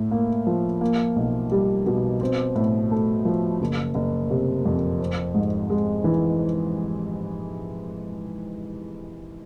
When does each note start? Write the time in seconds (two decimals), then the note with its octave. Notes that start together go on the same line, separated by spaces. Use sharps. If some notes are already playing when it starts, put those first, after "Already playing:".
Already playing: A2
0.11 A#3
0.47 F3
0.81 A#3
1.16 B1
1.52 G3
1.86 B2
2.21 C4
2.55 A2
2.91 A3
3.25 F3
3.61 F#1
3.95 F#1
4.31 C3
4.66 F2
4.99 C4
5.34 G#2
5.70 G#3
6.04 E3